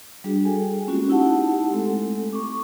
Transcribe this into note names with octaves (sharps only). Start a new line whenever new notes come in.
G3 D4 F#4 G#4
G#4 A4 G5 G#5
G#3 A#3 C4 C#4 F4 F#4
D#4 E4 G4 F#5 A5
G#3 A3 C4 A4
C#6 D6